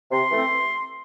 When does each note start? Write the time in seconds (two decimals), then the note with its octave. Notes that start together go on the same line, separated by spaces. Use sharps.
0.11 C3 C6
0.31 E3 A3 C4